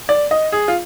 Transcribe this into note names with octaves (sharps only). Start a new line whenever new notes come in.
D5
D#5
G#4
F4